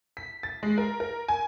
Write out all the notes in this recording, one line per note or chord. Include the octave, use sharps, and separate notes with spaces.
B6
A6
G#3
A#4
A#4
G#5